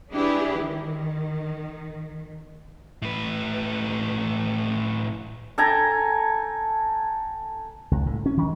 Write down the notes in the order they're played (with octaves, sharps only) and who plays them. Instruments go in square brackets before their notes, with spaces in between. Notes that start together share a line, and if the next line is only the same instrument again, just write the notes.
[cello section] D4 E4 G4 G#4 B4
D#3
[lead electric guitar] A2 B4
[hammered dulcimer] A4 G5 G#5 A#5
[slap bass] C#2
A2
C#4
D#3